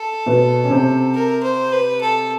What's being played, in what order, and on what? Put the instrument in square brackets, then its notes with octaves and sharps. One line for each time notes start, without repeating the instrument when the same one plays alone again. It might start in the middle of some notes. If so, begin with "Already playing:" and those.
Already playing: [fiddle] A4
[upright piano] B2 B3
C#4
C3 C4
[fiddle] A#4
C5
B4
A4